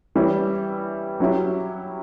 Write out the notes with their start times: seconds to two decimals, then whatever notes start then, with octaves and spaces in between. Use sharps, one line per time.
0.15 E3 G3 C#4 E4
1.20 F#3 C#4 E4 G4